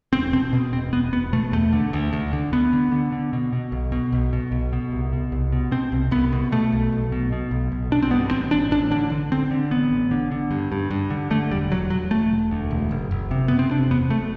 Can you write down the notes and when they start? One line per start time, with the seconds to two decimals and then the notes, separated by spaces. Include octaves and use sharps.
0.13 E1 C4
0.33 B2 C4
0.53 B2
0.72 E1 C4
0.92 E1 B3
1.12 E1 B3
1.33 B2 A3
1.52 E2 A3
1.73 D3
1.93 D2
2.13 D2
2.33 D3
2.53 D2 B3
2.73 D3
2.92 D3
3.12 D3
3.33 B2
3.53 B2
3.72 B1
3.92 B2
4.12 B1
4.33 B2
4.52 B1
4.73 B2
4.92 C2
5.13 B2
5.32 C2
5.53 B2
5.71 B2 C4
5.92 C2
6.11 C2 B3
6.32 B2
6.52 B2 A3
6.72 B1
6.92 B1
7.12 B2
7.32 B2
7.51 B1
7.72 B1
7.91 B1 D4
8.02 C4
8.11 G2 B3
8.31 A1 C4
8.51 A1 D4
8.71 A1 D4
8.91 D3 D4
9.12 D3
9.32 D3 C4
9.51 D3
9.71 A1 B3
9.91 A1
10.11 D3
10.31 D3
10.51 G2
10.72 G2
10.91 G2
11.10 D3
11.30 D3 A3
11.51 E1 G3
11.71 E1 F#3
11.90 E1 F#3
12.11 E1 A3
12.31 E1
12.51 D2
12.71 E1
12.91 F#1
13.11 F#1
13.31 C3
13.48 F#1 B3
13.59 C4
13.70 C3 D4
13.90 E2 B3
14.10 F#1 A3